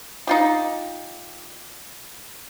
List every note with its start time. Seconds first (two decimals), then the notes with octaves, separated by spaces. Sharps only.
0.27 D#4 F4 G4